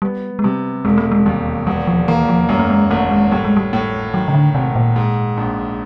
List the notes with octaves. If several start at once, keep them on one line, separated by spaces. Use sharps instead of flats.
G3 B3
G#3
C3 G3
E1 G#3
A3
G#3
D#2 G3
E2 G3
F3
E3 A#3
F3
F#2 G3
A3
G#3
G#1 A3
G#3
A2 G3
G#3
G3
A2
D#3 F#3
C#3
D3
G#1 C3
A#2
G#2
A#1